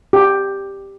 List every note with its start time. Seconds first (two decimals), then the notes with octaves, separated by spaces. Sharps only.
0.13 G4